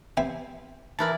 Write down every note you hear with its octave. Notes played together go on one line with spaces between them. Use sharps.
B3 C4 G4 E5 G#5
E3 E4 A#4 B4 D5 A5